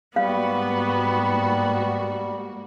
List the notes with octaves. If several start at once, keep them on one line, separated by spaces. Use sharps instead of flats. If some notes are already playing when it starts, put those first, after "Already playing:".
G#2 G3 A#3 B3 F#4 F5